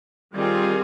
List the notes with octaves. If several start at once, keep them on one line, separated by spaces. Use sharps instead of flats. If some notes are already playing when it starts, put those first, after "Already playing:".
D#3 G3 C4 F4 G#4